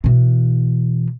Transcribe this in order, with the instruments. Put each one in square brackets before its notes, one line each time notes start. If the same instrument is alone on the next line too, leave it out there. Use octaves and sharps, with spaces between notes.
[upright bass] B2 E3